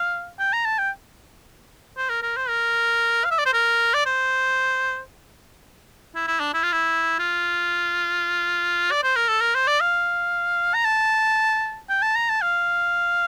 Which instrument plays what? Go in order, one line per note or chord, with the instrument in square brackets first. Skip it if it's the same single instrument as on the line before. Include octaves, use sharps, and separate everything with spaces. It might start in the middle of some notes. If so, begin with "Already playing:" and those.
Already playing: [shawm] F5
G5
A#5
A5
G5
C5
A#4
A#4
C5
A#4
F5
E5
D5
C5
A#4
D5
C5
E4
E4
D4
E4
F4
E4
F4
D5
C5
A#4
A4
A#4
C5
D5
F5
A#5
A5
G5
A5
A#5
A5
F5